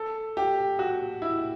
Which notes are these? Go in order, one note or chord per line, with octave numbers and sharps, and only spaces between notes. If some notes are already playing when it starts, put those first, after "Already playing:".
Already playing: A4
G4
F#4
E4